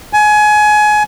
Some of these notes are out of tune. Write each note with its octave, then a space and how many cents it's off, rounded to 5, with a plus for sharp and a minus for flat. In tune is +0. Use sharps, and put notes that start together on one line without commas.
G#5 +25